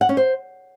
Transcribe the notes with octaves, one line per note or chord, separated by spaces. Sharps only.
F#5
C#4
C5